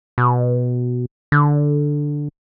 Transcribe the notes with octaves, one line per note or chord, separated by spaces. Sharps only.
B2
D3